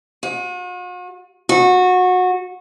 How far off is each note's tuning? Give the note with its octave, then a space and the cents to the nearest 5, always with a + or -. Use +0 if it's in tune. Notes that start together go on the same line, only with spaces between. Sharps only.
F#4 -45
F#4 -20